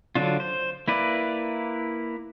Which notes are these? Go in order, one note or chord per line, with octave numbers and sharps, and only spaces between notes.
D3 F#3 D4 F4
C5
A#3 E4 B4 D5